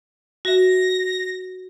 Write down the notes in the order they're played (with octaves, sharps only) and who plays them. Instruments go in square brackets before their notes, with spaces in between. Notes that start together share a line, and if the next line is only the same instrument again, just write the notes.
[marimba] F#4 E5 [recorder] A#6